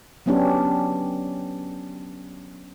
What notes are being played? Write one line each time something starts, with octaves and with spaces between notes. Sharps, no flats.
F#3 B3 C#4 D4 G4